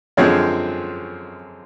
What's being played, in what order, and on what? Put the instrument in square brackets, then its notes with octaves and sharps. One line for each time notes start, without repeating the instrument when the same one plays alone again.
[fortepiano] F#2 D3 F3 G#3 C4 C#5